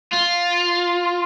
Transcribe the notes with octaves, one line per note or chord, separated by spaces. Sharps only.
F4